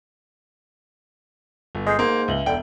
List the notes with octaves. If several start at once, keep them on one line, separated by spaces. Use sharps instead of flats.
G1
G#3 D#6 G6 C7
G#2 A#3 C6 G6
C#2 E5 F#7 G7
E1 D3 G5